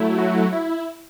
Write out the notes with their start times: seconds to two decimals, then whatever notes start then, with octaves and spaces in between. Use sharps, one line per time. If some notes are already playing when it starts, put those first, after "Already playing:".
Already playing: F#3 A3 E4
0.18 F#4
0.53 E4